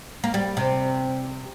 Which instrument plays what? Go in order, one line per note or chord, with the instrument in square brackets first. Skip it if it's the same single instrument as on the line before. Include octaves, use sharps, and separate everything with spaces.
[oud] A#3
G3
C3